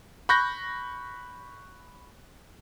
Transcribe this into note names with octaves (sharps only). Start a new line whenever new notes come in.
B5 C#6 F#6 G6 A#6